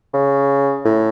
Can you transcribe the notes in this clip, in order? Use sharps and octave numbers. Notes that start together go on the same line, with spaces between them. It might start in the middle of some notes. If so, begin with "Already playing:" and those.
C#3
A2